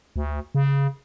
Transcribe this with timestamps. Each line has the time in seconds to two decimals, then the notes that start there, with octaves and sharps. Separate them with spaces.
0.16 D2
0.55 C#3